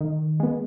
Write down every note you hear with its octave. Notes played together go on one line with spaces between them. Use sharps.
D#3
G#3 B3